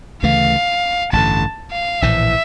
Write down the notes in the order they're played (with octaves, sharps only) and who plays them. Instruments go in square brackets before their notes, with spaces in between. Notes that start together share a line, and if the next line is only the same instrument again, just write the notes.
[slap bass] D2 C#3 E3 A3 [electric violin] F5
[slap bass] A1 G2 D3 [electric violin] A5
[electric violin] F5
[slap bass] A#1 A2 E3 [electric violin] E5